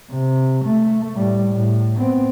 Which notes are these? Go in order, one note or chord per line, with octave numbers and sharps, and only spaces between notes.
C3
A3
A2 G3
A2
B3 C4